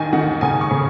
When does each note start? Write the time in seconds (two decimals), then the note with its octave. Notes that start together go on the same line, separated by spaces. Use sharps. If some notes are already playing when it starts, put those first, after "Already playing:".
Already playing: D#2 D#3 G#5
0.13 D#3 F#5
0.41 C#3 G#5
0.61 C#6
0.71 C#3